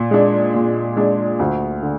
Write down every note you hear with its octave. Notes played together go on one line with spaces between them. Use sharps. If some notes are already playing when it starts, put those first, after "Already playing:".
Already playing: A#2
G#3 D4
A#2
G#3 D4
D2
D3